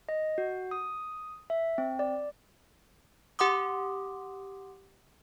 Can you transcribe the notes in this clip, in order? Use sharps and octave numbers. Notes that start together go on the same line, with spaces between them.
D#5
F#4
D#6
E5
C4
D5
G4 F#5 C6 D6 D#6